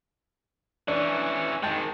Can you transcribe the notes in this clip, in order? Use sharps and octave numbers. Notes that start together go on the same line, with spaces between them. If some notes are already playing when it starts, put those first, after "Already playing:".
E3 C#4 D4
D#3 G#3 G5 A5